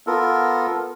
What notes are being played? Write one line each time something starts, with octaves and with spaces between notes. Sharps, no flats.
B3 F4 A4 A#4